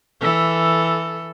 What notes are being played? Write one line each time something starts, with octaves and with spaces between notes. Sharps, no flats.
E3 A4